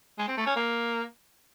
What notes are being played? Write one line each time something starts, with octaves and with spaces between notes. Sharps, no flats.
G#3
C4
A3
C#4
A#3